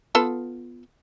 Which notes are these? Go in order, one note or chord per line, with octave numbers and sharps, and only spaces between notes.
B3 F4 A4